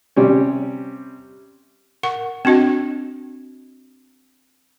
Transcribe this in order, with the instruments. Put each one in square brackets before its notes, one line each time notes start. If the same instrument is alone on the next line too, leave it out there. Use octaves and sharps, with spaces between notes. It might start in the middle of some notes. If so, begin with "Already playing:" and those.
[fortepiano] C3 G3 C#4
[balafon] A#4 F#5 C#6
C4 D4 F#4 D#5